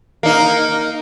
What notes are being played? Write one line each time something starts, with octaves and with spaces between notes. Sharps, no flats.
A#3 D#4